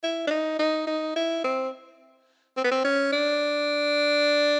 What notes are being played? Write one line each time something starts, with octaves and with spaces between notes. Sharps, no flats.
E4
D4
D#4
D#4
D#4
E4
C4
C4
B3
C4
C#4
D4